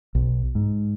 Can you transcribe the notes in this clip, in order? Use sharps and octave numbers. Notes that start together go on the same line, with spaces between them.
B1
G#2